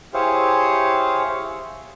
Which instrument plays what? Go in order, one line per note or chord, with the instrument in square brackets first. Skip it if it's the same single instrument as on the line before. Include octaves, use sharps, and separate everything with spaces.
[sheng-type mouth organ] E4 G4 G#4 C5 C#5 F5